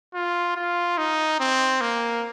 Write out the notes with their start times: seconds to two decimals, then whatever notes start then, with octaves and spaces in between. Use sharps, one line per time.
0.14 F4
0.56 F4
0.98 D#4
1.40 C4
1.81 A#3